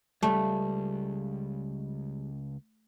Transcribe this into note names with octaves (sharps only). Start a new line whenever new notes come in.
C#2 G3 A3